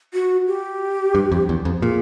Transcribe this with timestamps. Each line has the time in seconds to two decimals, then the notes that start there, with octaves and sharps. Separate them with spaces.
0.14 F#4
0.47 G4
1.15 G2
1.31 F2
1.49 E2
1.65 F2
1.82 A#2 G#4